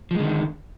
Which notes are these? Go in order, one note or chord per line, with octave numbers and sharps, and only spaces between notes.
D3 D#3 F3 G#3